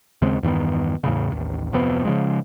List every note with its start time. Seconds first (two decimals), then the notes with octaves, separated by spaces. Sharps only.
0.22 D#2 C#3 G#3 C4
0.43 E2 G2 D#3 B3
1.04 E2 A2 C#3
1.32 A1 D#2
1.72 D1 F2 C3 B3
2.05 C#3 F3 G#3